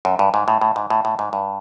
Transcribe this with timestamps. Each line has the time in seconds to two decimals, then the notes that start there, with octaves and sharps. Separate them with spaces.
0.05 F#2
0.19 G2
0.34 G#2
0.48 A2
0.61 A2
0.76 G#2
0.90 A2
1.05 A2
1.19 G#2
1.33 G2